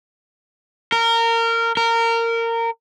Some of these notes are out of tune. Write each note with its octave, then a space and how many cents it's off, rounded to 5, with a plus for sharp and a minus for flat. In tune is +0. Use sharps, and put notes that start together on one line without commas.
A#4 -20
A#4 -20